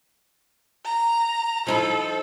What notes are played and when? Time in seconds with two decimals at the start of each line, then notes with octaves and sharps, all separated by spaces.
0.85 A#5
1.67 F3 D#4 E4 A4